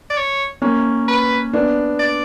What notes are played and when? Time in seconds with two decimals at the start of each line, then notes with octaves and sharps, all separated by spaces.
0.10 D5
0.17 C#5
0.62 A#3 C#4
1.08 B4
1.53 B3 D4
1.99 D5